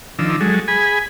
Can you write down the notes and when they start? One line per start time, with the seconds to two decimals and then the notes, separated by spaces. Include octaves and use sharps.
0.19 D#3 F3 D4 E6
0.40 F#3 G#3 A4
0.68 G#4 G#5 B5